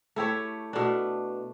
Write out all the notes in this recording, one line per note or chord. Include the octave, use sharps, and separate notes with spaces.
A3 E4 G4 C#5
B2 A3 D4